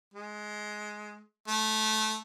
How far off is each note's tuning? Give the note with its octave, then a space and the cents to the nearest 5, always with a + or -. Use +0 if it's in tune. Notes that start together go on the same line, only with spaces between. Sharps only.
G#3 +15
A3 -15